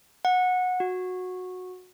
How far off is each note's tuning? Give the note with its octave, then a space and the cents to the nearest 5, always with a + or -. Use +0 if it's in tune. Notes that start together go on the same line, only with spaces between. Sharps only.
F#5 -20
F#4 -15